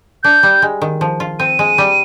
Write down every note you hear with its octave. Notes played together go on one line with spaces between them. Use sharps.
D4 G6
G3
G#3
D#3
F3
F4
C4 D#7
G#3
G3